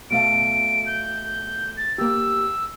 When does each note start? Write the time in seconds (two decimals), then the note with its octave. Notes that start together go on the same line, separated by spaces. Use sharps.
0.11 B2 A3 F5 D7
0.86 G6
1.77 A6
1.98 A#3 G4 E6